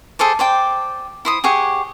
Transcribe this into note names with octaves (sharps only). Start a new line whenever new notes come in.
G#4 A4 C5 D5
C5 D5 G5
E4 C5 D#6
G4 G#4 C#5 F#5